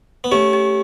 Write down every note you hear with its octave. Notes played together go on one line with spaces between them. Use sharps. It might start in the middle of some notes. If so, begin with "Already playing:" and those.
B3
A3 C#4 G4
G4